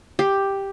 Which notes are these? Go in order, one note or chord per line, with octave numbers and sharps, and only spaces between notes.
G4